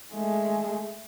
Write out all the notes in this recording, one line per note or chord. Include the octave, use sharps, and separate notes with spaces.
G#3 A3